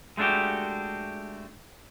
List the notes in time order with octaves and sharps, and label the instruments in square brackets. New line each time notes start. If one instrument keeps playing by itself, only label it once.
[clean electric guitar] G#3 A3 D4 F#4 G4